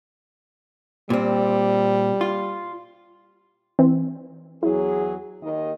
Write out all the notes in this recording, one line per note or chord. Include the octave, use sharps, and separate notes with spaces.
A#2 G3 C4
F4
E3 C4
E2 F#3 E4 G#4
D#2 D#3 D#5